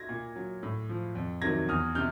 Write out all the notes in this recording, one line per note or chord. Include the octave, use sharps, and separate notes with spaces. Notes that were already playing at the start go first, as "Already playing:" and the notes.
Already playing: G#6 A#6
A#2
F#3
A2
F3
F2
C3 D#3 F#3 G#6 A#6
E2 D#6 F6
C3 F6 G6